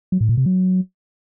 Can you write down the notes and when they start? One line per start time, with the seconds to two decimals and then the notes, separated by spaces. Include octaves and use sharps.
0.12 F#3
0.21 A2
0.29 A#2
0.37 C3
0.46 F#3